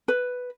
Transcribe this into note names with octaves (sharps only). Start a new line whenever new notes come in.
B4